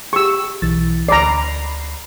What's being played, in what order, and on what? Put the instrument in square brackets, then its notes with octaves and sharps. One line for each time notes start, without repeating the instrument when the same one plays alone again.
[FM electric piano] G4 G#4 [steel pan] C#6 E6
[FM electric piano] B1 E3 A6
[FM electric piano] D2 B5 C7 [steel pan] D5 A#5